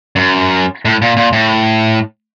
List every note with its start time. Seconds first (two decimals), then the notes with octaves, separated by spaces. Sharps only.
0.16 F#2
0.85 A2
1.02 A#2
1.17 A#2
1.33 A2